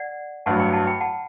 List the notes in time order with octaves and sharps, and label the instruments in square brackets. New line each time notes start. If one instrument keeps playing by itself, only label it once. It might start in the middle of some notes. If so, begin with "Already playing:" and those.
Already playing: [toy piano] D5 F#5
[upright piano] A1 G2 F#3 [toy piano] F#5 A5
[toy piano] G5 B5
F#5 A5
G5 B5
F#5 A5